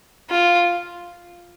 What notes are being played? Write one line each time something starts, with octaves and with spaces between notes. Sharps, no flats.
F4